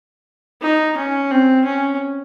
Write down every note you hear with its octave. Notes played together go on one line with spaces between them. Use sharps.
D#4
C#4
C4
C#4